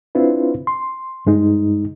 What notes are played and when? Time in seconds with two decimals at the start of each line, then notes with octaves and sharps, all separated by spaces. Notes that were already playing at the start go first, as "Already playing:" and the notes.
0.15 C4 D4 E4 F4 B4
0.67 C6
1.27 G2 G#3 D#4